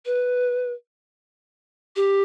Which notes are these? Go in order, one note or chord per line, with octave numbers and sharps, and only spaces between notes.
B4
G4